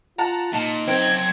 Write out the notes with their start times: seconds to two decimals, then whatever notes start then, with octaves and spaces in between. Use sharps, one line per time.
0.18 F4 F#5 A5 A#5
0.53 A#2 D#4 A5
0.88 F#2 C4 G5 G#6